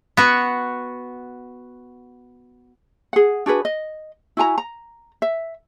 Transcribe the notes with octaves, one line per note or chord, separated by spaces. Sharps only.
B3 F#4
G#4 F#5
D4 F#4 G#4 B4
D#5
E4 F#4 G#5 A#5
A#5
E5